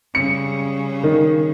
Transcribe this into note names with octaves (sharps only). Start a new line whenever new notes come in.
C#3 G3 C#7
D#3